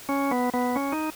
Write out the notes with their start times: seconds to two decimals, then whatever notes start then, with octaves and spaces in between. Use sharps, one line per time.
0.09 C#4
0.31 B3
0.54 B3
0.76 C#4
0.92 D#4